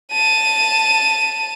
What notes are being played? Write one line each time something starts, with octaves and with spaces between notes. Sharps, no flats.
A5 D#7